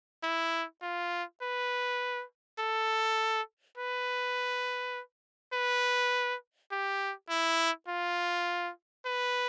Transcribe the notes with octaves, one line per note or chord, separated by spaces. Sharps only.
E4
F4
B4
A4
B4
B4
G4
E4
F4
B4